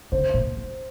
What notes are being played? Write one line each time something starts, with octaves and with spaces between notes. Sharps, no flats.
D3 C5
A#2
G2